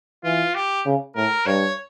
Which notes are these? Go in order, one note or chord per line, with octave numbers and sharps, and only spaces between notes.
E3 F4
G4
C#3
A2 A#4
G2 C#5